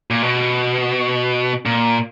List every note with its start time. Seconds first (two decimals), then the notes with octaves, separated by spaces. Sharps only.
0.10 A#2
0.22 B2
1.66 A#2